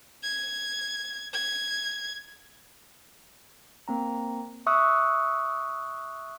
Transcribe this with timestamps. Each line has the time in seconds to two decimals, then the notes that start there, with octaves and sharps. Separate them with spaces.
0.23 G#6
1.34 G#6
3.88 A#3 C4 A#5
4.67 E5 C#6 D#6 E6 F#6